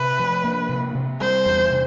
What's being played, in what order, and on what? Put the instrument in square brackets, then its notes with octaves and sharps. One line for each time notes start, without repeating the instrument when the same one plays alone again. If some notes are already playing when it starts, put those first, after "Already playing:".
Already playing: [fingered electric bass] C3 [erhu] B4
[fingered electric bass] F3
A#3
C3
C3
[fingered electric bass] G3 [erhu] C5
[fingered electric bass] E2
C3